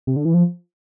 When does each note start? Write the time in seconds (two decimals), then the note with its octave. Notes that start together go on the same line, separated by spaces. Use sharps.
0.07 C3
0.16 D3
0.25 E3
0.34 F3